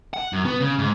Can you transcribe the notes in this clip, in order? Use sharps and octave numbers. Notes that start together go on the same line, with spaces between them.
F#5
F#2
B3
C#3
G#2